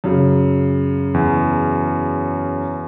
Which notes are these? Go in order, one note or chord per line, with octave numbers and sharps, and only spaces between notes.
F#2 C#3
E2